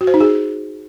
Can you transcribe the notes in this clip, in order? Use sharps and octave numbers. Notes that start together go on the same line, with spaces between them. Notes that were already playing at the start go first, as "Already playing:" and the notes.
F#4
C5
D#4
G#4